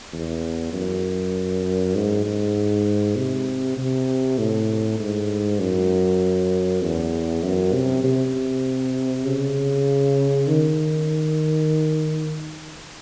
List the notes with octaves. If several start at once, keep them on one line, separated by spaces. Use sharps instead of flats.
E2
F#2
G#2
G#2
C3
C3
A2
G#2
F#2
E2
F#2
C3
C3
C#3
D#3